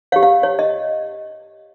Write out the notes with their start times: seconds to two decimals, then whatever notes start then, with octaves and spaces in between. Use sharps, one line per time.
0.12 C#5 F5
0.16 G4
0.23 F5
0.43 C#5
0.59 D#5